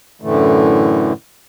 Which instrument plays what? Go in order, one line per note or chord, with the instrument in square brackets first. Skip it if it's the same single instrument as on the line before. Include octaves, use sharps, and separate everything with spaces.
[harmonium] F#2 A2 D3 E3 A3